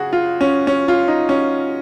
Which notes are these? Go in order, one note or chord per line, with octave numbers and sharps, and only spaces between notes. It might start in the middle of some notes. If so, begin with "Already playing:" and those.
Already playing: C#3 F#4 G#4
F4
C#4
C#4
F4
D#4
C#4